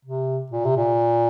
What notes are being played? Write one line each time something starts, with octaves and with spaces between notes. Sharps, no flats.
C3
A#2
C3
A#2